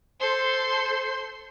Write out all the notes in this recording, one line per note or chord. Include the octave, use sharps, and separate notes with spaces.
A4 C5 C6